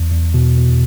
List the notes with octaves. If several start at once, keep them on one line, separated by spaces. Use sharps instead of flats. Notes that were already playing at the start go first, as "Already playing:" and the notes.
Already playing: E2
E2
B2
B2